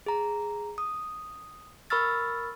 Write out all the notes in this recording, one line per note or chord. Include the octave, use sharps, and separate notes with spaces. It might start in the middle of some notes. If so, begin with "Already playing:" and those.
G#4 A#5
D#6
A#4 B5 C#6 E6 F6 A6